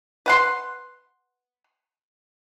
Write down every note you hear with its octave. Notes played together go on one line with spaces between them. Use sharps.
B4 F#5 C6